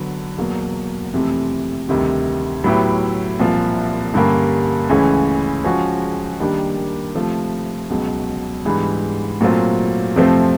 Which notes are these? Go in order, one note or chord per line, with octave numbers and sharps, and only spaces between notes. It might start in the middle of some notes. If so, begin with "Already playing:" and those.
Already playing: D3 F#3 B3
E2 B2 F#3 A#3
F2 C3 E3 A3
D2 C3 D#3 G3
A2 F#3 B3 E4 G4
C2 A#2 F3
G2 D3 G3 A#3 C#4
C#2 C#3 E3 A3 C#4
F3 G#3 C#4 F#4
D#3 G3 A#3 D4 G4
C3 F3 A3
C#2 B2 F#3
G#2 E3 G3 B3 D4
A#2 F#3 A3 C4 F4
F2 C3 F3 A3 C4